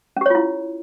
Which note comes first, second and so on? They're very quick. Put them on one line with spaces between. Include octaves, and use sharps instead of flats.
C#4 G4 C#5 F4 E4